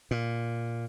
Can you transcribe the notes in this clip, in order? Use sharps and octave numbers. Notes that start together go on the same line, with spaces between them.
A#2